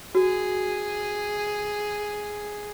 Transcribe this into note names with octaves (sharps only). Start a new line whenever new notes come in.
F#4 G#4